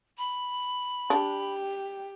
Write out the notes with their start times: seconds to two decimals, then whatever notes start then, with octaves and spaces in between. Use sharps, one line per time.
0.17 B5
1.10 D4 G4